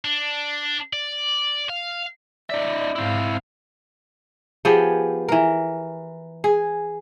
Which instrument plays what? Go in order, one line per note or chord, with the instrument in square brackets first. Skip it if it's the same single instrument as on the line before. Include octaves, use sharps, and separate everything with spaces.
[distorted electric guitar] D4
D5
F5
[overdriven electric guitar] D#4 E5 [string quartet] D5
[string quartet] G#2 F5 [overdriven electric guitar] C4 E4
[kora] F3 B3 G4 G#4
E3 A#4
G#4